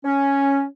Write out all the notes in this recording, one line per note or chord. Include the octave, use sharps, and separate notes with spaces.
C#4